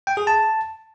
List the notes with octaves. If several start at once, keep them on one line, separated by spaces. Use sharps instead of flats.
G5
G#4
A5